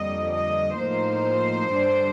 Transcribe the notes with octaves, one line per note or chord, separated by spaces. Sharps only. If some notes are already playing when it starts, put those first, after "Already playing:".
Already playing: F2 D3 G3 A#3 D#5
D#5
A2 F3 A#3 D#4 C5
G2 D3 G3 D4